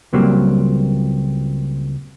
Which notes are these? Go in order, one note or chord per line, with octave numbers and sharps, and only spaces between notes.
C#2 A#2 F#3 G3 A#3 C4